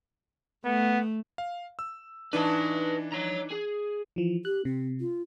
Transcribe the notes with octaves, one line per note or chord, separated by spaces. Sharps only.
A3 B3
F5
E6
E3 D4 D#4 B4 A5
C#5 A#5
G#4
E3 F3
G4 F#6
C3 C4
F4